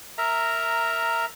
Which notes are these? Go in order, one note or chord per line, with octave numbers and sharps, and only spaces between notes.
A#4 E5 A#5